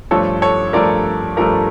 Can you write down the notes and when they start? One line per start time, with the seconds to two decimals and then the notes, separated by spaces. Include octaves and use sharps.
0.11 G2 F3 A3 A4 C#5
0.42 A4 C#5
0.73 G2 F3 A3 A#4 D5
1.37 G2 F3 A3 A#4